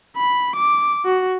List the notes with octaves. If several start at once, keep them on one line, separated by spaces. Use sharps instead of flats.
B5
D6
F#4